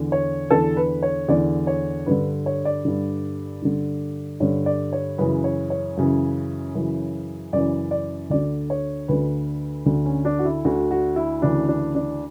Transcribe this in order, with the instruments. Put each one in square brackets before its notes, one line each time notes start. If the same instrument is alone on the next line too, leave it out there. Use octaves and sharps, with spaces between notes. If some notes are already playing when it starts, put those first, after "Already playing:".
Already playing: [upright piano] E2 D3
C#5
E2 D3 A4
B4
C#5
E2 D3 D5
C#5
G2 D3 B4
C#5
D5
G2 D3
G2 D3
G2 D3 C#5
D5
C#5
F#2 C#3 E3 B4
C#5
C#5
F#2 C#3 E3
F#2 C#3 E3
F#2 C#3 E3 D5
D5
D2 D3 D5
C#5
D2 D3 B4
D2 D3
C#4
D4
F#4
E4
D2 D3 F#4
F#4
E4
D2 C#3 E3 D4
D4
D4